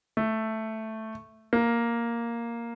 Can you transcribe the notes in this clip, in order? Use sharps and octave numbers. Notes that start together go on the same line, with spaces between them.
A3
A#3